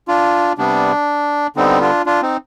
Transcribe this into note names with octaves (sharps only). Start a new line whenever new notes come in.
D4 F4
C3 G3 B3 D4
D3 G3 B3 C4 D#4
D4 F4
D4 F4
C4 D#4